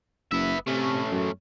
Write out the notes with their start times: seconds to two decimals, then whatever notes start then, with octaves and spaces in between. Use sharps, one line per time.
0.31 F#1 B3 E5
0.67 C3 A3 C#4
1.12 F#2